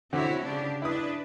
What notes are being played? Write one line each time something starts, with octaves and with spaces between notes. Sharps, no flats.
D3 C4 E4 F#4 C#5
C#3 D4 G4
D4 E4 B4 D#6